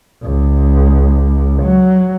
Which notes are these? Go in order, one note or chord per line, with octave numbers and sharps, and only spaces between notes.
C#2
F#3